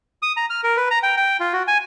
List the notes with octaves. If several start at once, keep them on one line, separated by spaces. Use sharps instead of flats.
D#6
A#5
F6
A#4
B4
A#5
G5
G5
F4
F#4
G#5